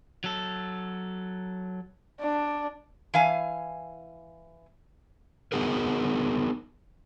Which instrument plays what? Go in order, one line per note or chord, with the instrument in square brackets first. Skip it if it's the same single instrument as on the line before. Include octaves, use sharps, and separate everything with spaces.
[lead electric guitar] F#3 A4
[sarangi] D4
[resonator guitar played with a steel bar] E3 F5 G#5
[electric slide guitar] B3 D#4 F#4 G#4 A#4